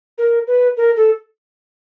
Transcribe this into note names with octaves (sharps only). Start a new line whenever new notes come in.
A#4
B4
A#4
A4